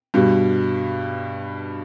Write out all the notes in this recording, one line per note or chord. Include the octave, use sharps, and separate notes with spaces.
G2 B2